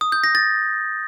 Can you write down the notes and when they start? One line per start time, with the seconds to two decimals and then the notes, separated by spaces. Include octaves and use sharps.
0.01 D#6
0.12 G6
0.24 A#6
0.35 A6